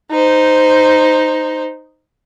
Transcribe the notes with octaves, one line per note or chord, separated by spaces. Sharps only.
D#4 C5